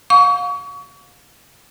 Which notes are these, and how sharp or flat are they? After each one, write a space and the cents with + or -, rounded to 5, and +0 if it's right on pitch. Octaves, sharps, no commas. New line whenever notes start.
F5 +40 C#6 +35